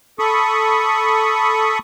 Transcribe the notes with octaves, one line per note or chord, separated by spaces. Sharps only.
A4 B5 C#6 D#6